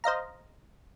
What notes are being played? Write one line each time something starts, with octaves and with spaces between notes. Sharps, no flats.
C5 D#5 F5 A#5